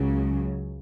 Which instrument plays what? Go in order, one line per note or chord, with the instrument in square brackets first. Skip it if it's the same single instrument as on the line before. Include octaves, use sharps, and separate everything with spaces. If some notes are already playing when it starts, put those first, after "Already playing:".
Already playing: [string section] C#2 C#3 F#3